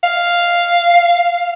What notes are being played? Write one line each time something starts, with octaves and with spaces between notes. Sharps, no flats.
F5